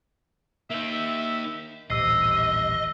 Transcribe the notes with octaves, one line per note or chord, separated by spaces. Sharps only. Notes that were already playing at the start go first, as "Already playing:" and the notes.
A#3 D#4 E5
D#1 A1 G2 C3 D#5 E6 C7